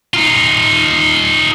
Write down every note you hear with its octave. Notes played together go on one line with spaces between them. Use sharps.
D#4 F4